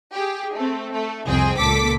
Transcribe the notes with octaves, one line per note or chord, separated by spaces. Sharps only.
G4 G#4
A3 C4
A3
C2 F2 C4 G#4 G5
C#2 A#2 A4 D6 B6